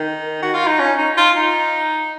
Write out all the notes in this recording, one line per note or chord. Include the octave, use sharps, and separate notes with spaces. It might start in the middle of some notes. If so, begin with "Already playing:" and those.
Already playing: D#3
F#4
F4
D#4
C#4
D#4
F4
D#4